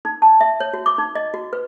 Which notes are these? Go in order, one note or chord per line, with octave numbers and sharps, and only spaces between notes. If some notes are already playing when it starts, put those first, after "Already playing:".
D#4
A5
E5
C#5
F#4
D6
D#4
D#5
F#4
B4